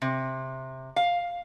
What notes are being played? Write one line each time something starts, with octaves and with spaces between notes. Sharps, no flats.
C3
F5